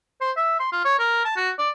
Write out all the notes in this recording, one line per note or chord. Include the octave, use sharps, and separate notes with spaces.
C5
E5
C6
F4
C#5
A#4
A5
F#4
D5